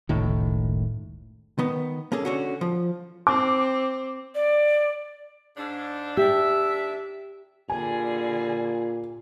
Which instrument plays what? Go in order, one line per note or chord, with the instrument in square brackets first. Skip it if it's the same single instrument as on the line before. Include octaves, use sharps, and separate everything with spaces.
[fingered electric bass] F#1 C#2 A2 D#3
[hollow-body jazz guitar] D#3 B3
A#3 C#4 G#4 A4
D3 C#4 F#4
F3
[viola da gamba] C4 [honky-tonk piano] D6
[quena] D5
[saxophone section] G#2 D4
[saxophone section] D#2 D4 E5 [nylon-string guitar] G4
[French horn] A#2 [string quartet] D3 G3 G#4 [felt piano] G#5